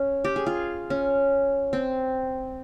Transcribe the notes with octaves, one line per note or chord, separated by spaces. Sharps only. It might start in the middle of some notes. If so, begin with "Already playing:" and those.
Already playing: C#4
G4
G#4
F4
C#4
C4